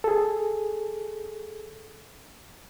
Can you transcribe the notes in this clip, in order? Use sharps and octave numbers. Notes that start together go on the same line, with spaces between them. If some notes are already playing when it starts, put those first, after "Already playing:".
G#4 A4